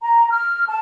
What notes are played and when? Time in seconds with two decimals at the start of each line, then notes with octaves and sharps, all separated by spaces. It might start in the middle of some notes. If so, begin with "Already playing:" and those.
0.02 A#5
0.31 F6
0.68 A5